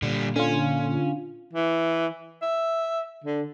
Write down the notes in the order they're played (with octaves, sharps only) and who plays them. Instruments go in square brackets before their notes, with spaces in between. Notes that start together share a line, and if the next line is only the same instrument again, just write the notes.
[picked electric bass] A#2 [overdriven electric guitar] D3 G3
[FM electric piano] D3 F4 [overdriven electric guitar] C#4
[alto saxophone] E3
E5
D3